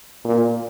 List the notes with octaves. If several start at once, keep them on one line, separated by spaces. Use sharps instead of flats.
A#2